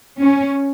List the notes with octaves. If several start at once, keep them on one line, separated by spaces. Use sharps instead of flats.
C#4